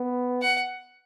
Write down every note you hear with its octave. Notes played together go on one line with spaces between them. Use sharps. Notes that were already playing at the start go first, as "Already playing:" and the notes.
Already playing: B3
F#5